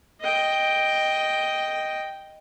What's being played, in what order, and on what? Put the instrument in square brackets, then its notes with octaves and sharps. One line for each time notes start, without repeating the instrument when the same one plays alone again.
[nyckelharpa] D#5 G5